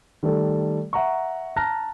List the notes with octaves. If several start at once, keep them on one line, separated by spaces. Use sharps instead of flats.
D#3 G3 A3 A4
E5 F#5 A#5 C#6
A5 A#5 F6 F#6 A#6